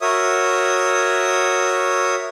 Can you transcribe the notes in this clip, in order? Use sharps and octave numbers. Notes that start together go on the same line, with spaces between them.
F#4 A#4 C#5 E5 D#6